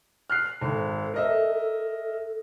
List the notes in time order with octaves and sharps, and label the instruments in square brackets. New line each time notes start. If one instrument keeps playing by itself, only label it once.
[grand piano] F6 F#6 C7
[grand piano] G#1 [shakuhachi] A4
[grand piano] A#4 D#5 E5